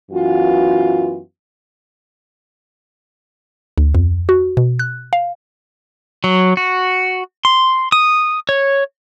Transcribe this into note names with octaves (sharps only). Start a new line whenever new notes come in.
F#2 E3 B3 F4 F#4
D2
F2
F#4
B2
F#6
F5
F#3
F#4
C6
D#6
C#5